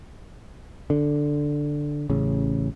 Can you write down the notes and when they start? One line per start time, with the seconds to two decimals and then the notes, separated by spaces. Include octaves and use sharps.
0.90 D3
2.10 A1 C#3